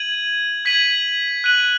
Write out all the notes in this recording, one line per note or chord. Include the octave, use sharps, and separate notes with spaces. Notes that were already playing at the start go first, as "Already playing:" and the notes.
Already playing: G#6 D#7 F#7
G#6 B6 D#7 F#7
F#6 D#7 F#7